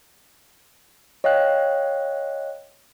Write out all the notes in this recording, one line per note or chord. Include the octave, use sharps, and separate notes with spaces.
C#5 D#5 F5 G5 F#6